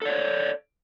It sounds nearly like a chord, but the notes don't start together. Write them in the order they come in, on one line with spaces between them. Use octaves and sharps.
A4 D5 C#5